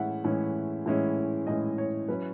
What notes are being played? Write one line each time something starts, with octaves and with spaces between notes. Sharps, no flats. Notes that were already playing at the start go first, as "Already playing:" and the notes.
Already playing: A2 E3 G#3 C#4 E4 E5 F#5
A2 E3 G#3 C#4 E4
A2 E3 G#3 C#4 E4
A2 E3 G#3 C#4 E4 D#5
C#5
F#3 C#4 E4 B4